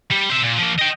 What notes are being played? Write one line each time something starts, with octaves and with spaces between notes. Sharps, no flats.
G3
C5 E5
A#2
F3 A#3
D#5 G5